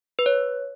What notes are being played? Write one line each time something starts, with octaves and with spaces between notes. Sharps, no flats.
B4
C#5